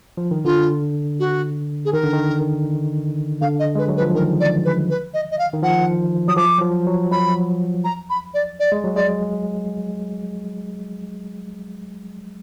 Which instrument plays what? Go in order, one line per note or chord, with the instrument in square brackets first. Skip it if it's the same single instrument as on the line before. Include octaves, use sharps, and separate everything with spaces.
[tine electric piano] F3
D#3
[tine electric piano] D3 [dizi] F4
[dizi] F#4
G#4
[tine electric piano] D#3 [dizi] A#4
[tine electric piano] D3
D#3
[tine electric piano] D3 [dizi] F5
[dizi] D#5
[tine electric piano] G#3 [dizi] B4
[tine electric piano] F#3
[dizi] B4
[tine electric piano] F3
[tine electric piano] D#3 [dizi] A#4
[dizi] D5
B4
B4
D#5
D#5
F5
[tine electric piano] D#3
[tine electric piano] F3 [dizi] F#5
[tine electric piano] F#3 [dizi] D#6
[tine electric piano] F3 [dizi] D6
[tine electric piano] F#3
F3
F#3
[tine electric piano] F#3 [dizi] B5
[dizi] A#5
B5
D5
D5
[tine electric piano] G#3
F#3
[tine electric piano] G#3 [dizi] D5